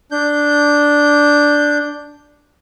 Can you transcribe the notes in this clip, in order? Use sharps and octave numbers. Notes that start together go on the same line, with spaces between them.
D4 G6